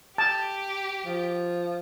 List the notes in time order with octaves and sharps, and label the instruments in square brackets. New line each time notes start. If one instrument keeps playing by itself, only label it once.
[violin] G4 [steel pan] A5
[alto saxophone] F3